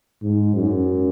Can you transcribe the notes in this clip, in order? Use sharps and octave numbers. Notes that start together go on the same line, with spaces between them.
G#2
F#2